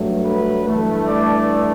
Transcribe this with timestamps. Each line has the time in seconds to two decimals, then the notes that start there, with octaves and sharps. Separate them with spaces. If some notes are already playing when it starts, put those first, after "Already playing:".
Already playing: G2 F#3 A3
0.23 B4
0.65 G2 E3 A3
1.08 D5